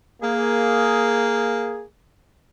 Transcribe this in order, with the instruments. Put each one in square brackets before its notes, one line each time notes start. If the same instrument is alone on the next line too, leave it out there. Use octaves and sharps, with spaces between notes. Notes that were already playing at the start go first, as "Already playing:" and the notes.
[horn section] A#3 G#4